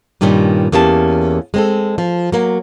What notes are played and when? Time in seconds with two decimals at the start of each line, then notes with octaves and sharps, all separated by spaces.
0.21 G2 A#2 D#3 G3 C#4
0.72 E2 A#3 C#4 G4 A5
1.54 G#3 C4 A4
1.98 F3
2.32 F#3 A#3